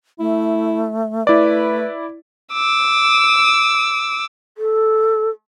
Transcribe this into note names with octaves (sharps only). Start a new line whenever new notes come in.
A3 E4
A3 E4 B4 D5
D6 E6
A4